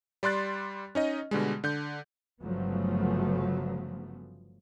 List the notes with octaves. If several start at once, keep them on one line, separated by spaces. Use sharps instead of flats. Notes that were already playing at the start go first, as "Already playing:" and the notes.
G3 D5 C6 F#6 A6
C#4 D#4 D#5
B2 D3 G3 G#3
D3 G6
G1 C#3 F3 F#3 A3 B3